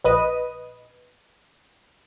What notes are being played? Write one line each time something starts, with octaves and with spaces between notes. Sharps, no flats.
A#1 B4 D#5 D#7